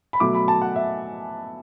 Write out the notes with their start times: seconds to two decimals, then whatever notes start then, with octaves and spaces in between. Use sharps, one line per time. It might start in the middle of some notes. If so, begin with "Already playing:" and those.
0.13 B5
0.20 B2 F#3 A3 D6
0.34 B5
0.48 A5
0.62 F#5
0.76 E5